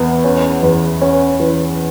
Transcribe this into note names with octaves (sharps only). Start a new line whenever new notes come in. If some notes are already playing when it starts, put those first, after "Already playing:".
Already playing: E2 B3
C#4
E2
C#4
E3